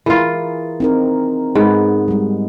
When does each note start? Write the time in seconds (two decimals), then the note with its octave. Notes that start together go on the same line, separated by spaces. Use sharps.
0.06 E3 F4 G#4 A#4
0.80 C4 D#4 A#4
1.55 G#2 B3
2.08 G3 G#3